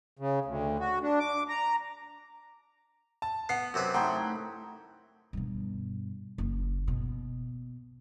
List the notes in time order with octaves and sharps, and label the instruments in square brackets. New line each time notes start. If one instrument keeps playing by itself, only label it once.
[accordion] C#3
D2
F#4
D4
D6
A#5
[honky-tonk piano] A5
[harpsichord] B3 [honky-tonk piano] F#5 C7
[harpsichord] F#2 C3 B4
[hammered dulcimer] A3 D#4 E4 [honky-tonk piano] F#5 G5 C6
[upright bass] G2 B2
F#1
B2